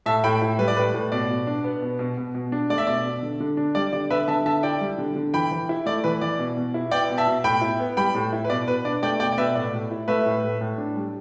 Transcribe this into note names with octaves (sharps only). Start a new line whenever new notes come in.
A2 E5 A5
A2 G5 B5
E4
G3 B4
D5
A2 B4
A2
B2 D5
B2
D4
B3
B2
B2
B2
B2
D4
A3 D5
E5
B2 D5
B2
D3
D3
D4
G3 D5
D3 D5
D3 B4 E5
D3 E5 A5
D3 E5 A5
E4 D5 G5
G3
D3
D3
E3 G5 B5
E3
E4
A3 D5
E3 B4
E3 D5
B2
B2
E4
B3 D5 G5
B2
E5 A5
B2
A2 G5 B5
E4
B3
G3 G5 B5
A2
E4
B4
B2 D5
B2 B4
D4 D5
A3 D5 G5
B2 D5 G5
D5
B2 B4 E5
A2 D5
A2
E4
A3 B4 E5
A2
A2
A2
D4
G3